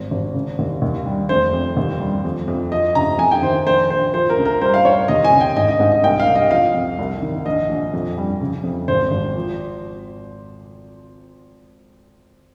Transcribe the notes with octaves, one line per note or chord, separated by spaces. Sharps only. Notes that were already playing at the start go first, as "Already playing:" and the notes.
Already playing: G#1
G#1
C#3
D#2
D#2
G3
F1 C5
F2
D#2
G3
F2
F2
F3 D#5
C#3 A#5
F2 G#5
G5
D#3 C5
A#1 C5
A#1 C5
F3 C5
A#4
C#2
A#4
G3 C5
F5
G3 C#5
D#2 D#5
G#5
C#3
G5
G#2 D#5
D#5
G#2
D#5
C2 G5
F5
C2
D#5
F3 F5
F2
C2
D#3
A#1 D#5
A#1
F2
G3
C#3
F2
G#1 C5
G#1
F3